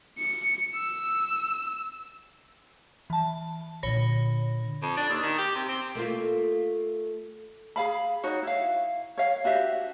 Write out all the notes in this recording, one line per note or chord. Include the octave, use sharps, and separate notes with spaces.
C#7
E6
E3 A5
A#2 D3 C#5 B5 A#6
F2
D4
D#2
D#3
G4
C3
C4
A3 A#3 F4
G#4 F5 B5
D#4 F#4 C#5
E4 F5
C#5 F5
D4 F#4 G4 E5